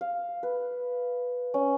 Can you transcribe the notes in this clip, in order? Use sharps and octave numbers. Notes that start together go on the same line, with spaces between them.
F5
B4
C#4